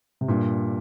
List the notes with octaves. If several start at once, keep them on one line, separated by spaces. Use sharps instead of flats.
C3
G2 A#2